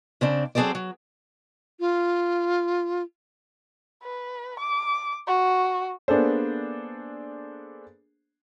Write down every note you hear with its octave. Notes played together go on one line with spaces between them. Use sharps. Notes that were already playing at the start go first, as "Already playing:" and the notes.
C#3 C4 D4
F#3 C4 G#4 A4 C5 D5
F#3
F4
B4
D6
F#4
A#3 B3 D4 G#4 A4 C5